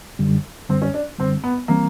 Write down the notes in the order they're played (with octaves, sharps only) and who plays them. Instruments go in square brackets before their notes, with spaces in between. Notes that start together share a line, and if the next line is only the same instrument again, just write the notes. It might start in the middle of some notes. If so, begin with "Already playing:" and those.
[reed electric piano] F#2 D3 G3
[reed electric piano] F#2 D3 G3 [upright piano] C4
[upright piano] C#4
D4
[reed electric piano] F#2 D3 G3 [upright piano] C4
[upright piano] B3
[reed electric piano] E3 G3 C4 [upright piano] A#3